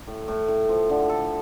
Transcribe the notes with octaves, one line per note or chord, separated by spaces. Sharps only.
A2
A2
A2
F3
D3
A4